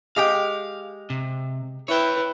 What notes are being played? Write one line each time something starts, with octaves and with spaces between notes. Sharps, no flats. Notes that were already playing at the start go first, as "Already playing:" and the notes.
G#3 G4 F5 G5
C3
E4 B4 C#5 G5